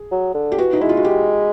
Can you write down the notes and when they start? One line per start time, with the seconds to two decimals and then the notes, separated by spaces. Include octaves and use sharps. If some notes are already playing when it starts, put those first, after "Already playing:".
Already playing: G#4
0.11 F#3
0.34 D3
0.52 G4
0.58 E3 F#4
0.73 D#4
0.81 G#3 E4
0.89 F4
0.97 F#4
1.05 G4